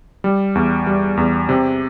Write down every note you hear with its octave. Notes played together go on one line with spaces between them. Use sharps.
G3
E2
G3
E2
C3